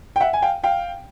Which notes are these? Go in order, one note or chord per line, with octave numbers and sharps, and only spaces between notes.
G5
E5 F#5
G#5
F5 G5
F5 G5